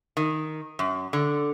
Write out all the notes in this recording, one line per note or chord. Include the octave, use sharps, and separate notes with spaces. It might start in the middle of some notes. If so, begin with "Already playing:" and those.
D#3
F#2
D3